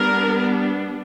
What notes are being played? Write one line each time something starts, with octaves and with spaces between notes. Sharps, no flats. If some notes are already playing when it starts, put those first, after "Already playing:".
Already playing: G3 B3 D4 A#4